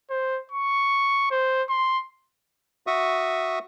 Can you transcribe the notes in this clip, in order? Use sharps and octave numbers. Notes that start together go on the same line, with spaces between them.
C5
C#6
C5
C6
F#4 E5 C#6 D#6